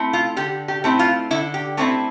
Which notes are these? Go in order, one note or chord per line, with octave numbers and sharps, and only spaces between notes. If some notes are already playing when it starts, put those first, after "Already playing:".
Already playing: A3 C4 E4
F4
D3 G4
G4
A3 C4 E4
F4
D3 E4
G4
A3 C4 E4 G4